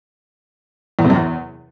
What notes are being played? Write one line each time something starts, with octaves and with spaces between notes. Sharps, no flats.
E2
C3
F#2
E2